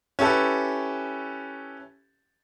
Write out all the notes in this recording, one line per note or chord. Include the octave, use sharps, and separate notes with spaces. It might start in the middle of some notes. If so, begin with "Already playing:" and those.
C#4 E4 G4 A4 B4